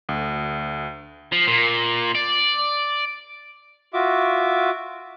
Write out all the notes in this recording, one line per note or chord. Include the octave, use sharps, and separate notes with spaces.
D2
F3
A#2
D5
F4 F#4 E5 D6